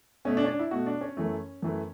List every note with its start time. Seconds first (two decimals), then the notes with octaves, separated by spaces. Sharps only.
0.25 B2 A3 C#4
0.37 D4
0.44 C#4
0.48 D4
0.59 E4
0.71 B2 A3 F#4
0.86 D4
1.01 C#4
1.17 F#2 E3 A3
1.62 F#2 E3 A3